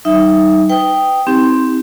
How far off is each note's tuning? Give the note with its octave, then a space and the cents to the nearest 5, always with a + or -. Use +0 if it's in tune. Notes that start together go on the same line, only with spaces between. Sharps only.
G3 -45 D#4 +0 E5 +0
B4 +25 G5 +0 D#6 +0
C4 +0 D#4 +35 G4 +0